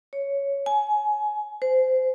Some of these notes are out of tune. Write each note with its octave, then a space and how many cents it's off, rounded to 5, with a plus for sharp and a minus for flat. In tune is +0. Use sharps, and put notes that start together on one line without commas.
C#5 +5
G#5 +25
C5 -20